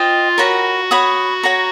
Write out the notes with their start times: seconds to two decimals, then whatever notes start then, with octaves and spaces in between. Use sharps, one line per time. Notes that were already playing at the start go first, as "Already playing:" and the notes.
Already playing: F4 C5 D#5 G5
0.38 F#4 A#4 C#5 F#5 B5
0.91 C#5 F#5 B5 D#6
1.43 C#5 F#5 A#5